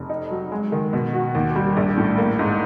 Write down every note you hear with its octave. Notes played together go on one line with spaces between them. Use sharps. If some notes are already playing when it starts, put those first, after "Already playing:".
Already playing: F1
D#4
F#3
G#3
D#3
B2
F#4
D#2
G3
A#1
A2
A#3
G#2